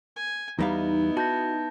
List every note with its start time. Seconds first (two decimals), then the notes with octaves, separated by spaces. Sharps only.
0.16 G#5
0.59 E2 G3 B3 D#4 E4 F5
1.17 F#4 A5 G6 A#6